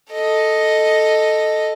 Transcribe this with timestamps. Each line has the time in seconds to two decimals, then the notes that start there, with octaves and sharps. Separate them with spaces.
0.12 A4 D#5